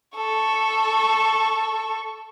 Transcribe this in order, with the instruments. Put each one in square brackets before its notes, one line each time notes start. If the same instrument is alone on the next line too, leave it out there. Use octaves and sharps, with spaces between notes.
[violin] A4 C#6